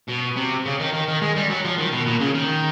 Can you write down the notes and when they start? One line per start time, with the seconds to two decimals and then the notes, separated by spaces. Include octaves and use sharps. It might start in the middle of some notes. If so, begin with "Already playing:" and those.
0.09 B2
0.37 C3
0.66 C#3
0.80 D#3
0.93 D#3
1.08 D#3
1.22 G#3
1.36 G3
1.50 F#3
1.65 F3
1.79 D#3
1.93 B2
2.07 A#2
2.21 C#3
2.35 D#3